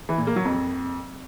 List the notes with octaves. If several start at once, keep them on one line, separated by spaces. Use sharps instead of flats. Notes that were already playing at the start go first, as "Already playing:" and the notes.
E3
A#2
A#3
F#3
F2